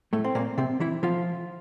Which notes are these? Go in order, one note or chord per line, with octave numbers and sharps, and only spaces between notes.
A2 A3
C4
A#2 A#3
C3 C4
E3 E4
F3 F4